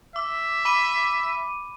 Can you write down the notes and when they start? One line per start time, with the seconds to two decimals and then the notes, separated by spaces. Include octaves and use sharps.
0.16 E5 D6
0.65 B5 D6 D#7